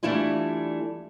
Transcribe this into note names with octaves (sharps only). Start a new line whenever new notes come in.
E3 G3 A3 D4 E4 F4